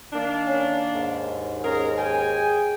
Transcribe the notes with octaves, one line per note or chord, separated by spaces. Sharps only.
D#3 A#3 D4
C#4
D#2 G#2
C#4 G#4 A#4
G#4 G5 G#5